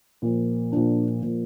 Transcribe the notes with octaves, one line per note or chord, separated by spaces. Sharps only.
A#2 F3
A#2 F3 D4
A#2 F3